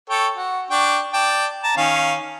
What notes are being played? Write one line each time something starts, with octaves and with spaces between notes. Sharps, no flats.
A4 C#5 G5
F#4
D4 G5 C#6
D5 G5 A5
A5 A#5
D#3 C#4 F5